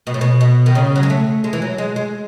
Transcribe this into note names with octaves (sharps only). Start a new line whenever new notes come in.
B2
A2
B2
B2
D#3
C#3
F#3
G#3
A3
G#3
E3
F#3
G#3
G#3